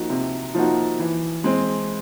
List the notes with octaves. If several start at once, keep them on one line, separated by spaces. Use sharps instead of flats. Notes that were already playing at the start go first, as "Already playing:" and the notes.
Already playing: F3 A#3 D#4 F#4
C3
F3 A#3 D#4 F#4
E3
G#3 C4